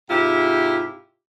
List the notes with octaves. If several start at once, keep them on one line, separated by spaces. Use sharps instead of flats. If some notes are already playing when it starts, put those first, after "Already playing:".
G#2 C3 E4 F4 G4